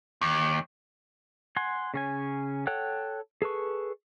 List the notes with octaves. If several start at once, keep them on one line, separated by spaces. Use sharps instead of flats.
D#2
F#5 G#5 C6
C#3 C#4 G#5
A4 C#5 F#5 G5 F#6
G#4 A4 B4 C#6